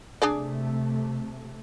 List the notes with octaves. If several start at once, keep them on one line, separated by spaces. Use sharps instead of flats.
C3 A3 D4 G#4 D5